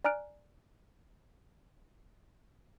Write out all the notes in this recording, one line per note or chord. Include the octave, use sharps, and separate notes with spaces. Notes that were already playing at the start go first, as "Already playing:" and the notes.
D5 G#5 A#5 F6 F#6 D7